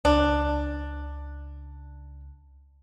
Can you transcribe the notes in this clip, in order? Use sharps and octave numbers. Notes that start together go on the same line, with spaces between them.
C#2 D4